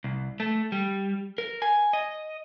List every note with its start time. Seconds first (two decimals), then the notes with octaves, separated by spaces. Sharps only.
0.04 C2
0.40 A3
0.72 G3
1.38 A#4
1.62 G#5
1.93 D#5